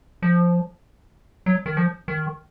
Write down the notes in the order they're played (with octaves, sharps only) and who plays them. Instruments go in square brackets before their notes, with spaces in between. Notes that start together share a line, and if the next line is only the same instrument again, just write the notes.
[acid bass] F3
F#3
D#3
F3
D#3